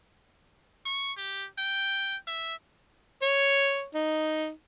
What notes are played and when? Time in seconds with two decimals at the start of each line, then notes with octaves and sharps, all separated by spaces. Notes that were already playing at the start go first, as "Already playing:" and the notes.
0.85 C#6
1.17 G4
1.58 G5
2.27 E5
3.22 C#5
3.94 D#4